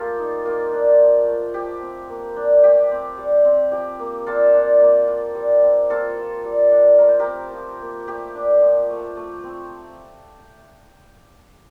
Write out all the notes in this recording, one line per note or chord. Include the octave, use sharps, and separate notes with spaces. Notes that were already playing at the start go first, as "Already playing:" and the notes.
Already playing: A3 A#3 F4 G4 A4 F5
D#4
A#3 F4
D4
F3
A3
F3 G4
C4
A#3
D4
A3 G4
C4
G3
C4
F3 G4
A#3
G3 F4 A4
D4
A#3
F4
G3
C4
A#3 F4 A4
F4
G3
D4
A3 A#4
C5
G4 A#4
C4
F3
A#3
A3 G4
D4
F3
A3
A3
C4